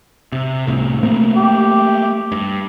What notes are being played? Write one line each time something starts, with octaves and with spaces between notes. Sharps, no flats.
C3
C2 A2 C3
A3 A#3 C4
G4
G2